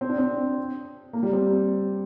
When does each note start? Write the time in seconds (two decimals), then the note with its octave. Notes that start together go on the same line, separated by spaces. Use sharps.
0.01 C4
0.09 D4
0.18 C4
1.13 A#3
1.23 G3
1.33 C4